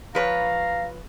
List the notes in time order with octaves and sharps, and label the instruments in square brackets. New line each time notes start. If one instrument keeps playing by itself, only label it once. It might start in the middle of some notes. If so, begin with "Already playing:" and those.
[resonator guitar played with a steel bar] F3 B4 C#5 [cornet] F5 [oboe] A#5